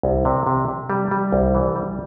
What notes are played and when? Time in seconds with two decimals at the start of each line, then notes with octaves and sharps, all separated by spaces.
0.03 C2
0.25 C3
0.47 C3
0.68 C3
0.90 G3
1.11 G3
1.32 C2
1.55 E3
1.75 G3